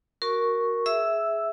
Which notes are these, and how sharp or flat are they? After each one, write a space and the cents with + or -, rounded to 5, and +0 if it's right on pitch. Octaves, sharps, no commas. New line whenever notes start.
F#4 +0 A#4 +0 C#6 +0
G#4 +10 E5 +0 E6 +0